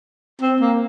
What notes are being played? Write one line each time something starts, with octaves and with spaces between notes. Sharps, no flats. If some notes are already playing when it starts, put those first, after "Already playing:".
C4
A#3